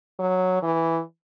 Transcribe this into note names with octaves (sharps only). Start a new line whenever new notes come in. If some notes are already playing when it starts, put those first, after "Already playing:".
F#3
E3